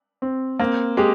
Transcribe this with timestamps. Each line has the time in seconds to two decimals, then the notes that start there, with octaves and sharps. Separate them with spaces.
0.22 C4
0.59 A#3 C4
0.97 G#3 G4